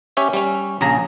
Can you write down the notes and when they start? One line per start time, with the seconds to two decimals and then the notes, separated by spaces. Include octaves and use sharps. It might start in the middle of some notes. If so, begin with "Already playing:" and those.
0.17 C#4 G4 C#5 E5
0.33 G3 C#4
0.81 A#1 C#3 G#4 A#5